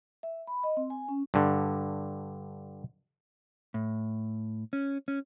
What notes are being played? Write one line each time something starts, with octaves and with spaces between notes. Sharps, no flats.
E5
B5
D#5
C4
G#5
C#4
G2 D3
A2
C#4
C#4